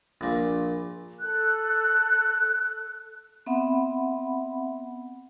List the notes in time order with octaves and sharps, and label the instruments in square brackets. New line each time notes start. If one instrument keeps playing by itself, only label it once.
[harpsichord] A#1 A#2
[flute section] A4 F#6
[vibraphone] B3 C4 E5 F#5 B5